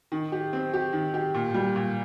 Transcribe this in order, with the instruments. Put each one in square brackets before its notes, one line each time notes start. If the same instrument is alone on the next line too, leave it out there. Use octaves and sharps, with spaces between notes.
[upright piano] D#3
G4
C4
G4
D#3
G4
A#2
G3
A#2